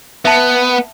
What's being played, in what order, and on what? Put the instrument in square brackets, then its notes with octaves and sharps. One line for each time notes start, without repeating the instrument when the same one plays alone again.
[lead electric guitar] B3 [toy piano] E5 A5